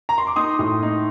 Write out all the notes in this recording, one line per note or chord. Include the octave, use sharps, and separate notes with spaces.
A#5
C6
D6
D#4 C6 D#6
A2
D#4